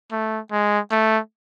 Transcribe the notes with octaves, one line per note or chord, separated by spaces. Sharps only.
A3
G#3
A3